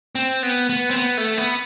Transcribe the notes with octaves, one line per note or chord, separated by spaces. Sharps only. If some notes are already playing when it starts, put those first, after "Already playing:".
C4
B3
B3
C4
B3
A3
B3